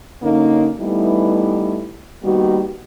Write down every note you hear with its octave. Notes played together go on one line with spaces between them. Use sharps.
F#2 D3 A#3 C#4 D#4
E3 G3 A3 B3 D#4 E4
D#3 G3 A#3 B3 F#4